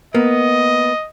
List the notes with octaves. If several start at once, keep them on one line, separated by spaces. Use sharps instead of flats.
A#3 B3 D#5